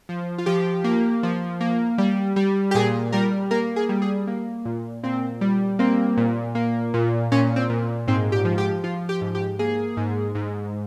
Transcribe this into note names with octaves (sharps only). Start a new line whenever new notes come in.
F3
F4
F3 G4
A#3
F3
A#3
G3
G3
G4
A#2 G#4
G3 A#4
A#3 A#4
G#4
G3
G#4
A#3
A#2
A#2 C4
G3
A#3 C4
A#2
A#3
A#2
A#2 C#4
C4
A#2
G#2 C4
G4
F3
G4
F3 F4
G4
G#2
G4
A#3 G#4
G#2
G#2